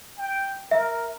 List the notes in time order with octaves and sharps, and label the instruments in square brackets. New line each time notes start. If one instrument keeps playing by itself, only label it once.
[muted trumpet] G5
[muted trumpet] A#4 [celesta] E5